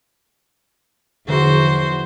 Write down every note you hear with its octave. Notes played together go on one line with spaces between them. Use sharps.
E2 D3 F3 F#4 G#4 C5